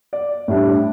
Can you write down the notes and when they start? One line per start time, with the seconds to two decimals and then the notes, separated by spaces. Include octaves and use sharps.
0.13 D5
0.48 A2 G3 D4